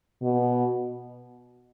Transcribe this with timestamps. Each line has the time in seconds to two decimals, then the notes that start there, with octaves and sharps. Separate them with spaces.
0.22 B2